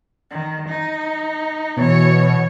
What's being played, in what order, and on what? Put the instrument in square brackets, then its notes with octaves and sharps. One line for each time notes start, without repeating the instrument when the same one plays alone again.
[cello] D#3
D#4
[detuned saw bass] B2 [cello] E3 C#5